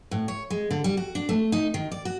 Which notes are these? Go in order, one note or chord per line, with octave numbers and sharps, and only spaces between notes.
A2
C#5
G#3
D3
G3
F#4
D4
A3
D#4
D#3
D5
F#4